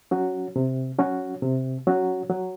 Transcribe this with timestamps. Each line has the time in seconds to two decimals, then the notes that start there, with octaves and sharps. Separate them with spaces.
0.11 F#3 C#4 F#4
0.56 C3
0.98 F#3 C#4 F#4
1.42 C3
1.87 F#3 C#4 F#4
2.30 F#3